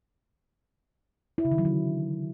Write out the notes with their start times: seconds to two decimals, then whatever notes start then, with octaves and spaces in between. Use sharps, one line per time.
1.38 E4
1.45 C#3
1.52 D#3
1.58 F#3
1.65 D3